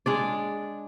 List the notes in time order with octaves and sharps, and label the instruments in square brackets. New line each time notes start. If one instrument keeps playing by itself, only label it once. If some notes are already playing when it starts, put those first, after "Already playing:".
[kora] G#3 D4 D5